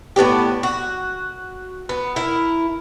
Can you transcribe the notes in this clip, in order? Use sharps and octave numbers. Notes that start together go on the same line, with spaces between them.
A2 B3 D4 G4
F#4
B3
E4 A#4